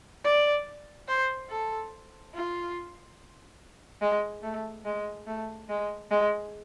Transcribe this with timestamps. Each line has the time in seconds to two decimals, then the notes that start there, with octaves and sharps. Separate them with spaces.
0.24 D5
1.08 C5
1.50 A4
2.35 F4
4.01 G#3
4.43 A3
4.85 G#3
5.27 A3
5.69 G#3
6.11 G#3